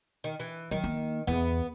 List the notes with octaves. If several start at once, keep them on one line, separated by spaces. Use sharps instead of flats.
D#3
E3
D#3 F#3
A#3
E2 B3